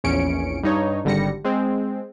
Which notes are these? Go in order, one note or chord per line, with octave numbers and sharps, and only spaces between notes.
A#1 E2 C#4 C#7 D7
G2 D#4 C#5
G#1 D3 G3 A#6 C#7
G#3 C4